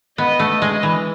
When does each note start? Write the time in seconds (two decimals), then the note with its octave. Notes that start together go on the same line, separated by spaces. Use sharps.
0.18 B3 D#5
0.40 A3
0.62 G#3
0.83 E3